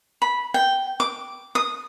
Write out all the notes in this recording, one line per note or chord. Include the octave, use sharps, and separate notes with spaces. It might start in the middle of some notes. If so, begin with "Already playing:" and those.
B5
G5
D6
D#6